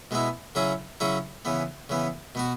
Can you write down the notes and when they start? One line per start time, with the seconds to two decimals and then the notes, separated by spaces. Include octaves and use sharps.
0.11 B2 G#3 B3 E4
0.55 C#3 F#3 C#4 E4 G#4
1.00 C#3 F#3 C#4 E4 G#4
1.45 C#3 E3 B3
1.90 C#3 E3 B3
2.35 B2 B3 F#4